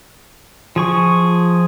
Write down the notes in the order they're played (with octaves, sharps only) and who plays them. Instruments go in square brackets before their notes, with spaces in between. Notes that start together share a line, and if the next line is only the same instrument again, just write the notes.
[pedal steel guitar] F3 G#4 C#6